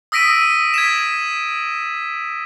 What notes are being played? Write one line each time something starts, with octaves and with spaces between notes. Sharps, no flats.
D#6 E6 A#6 B6 D7 D#7
G#6 B6 E7